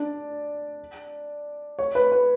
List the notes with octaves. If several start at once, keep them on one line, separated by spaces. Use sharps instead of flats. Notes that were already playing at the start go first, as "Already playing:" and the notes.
Already playing: D4 D5
C#5
B4
B4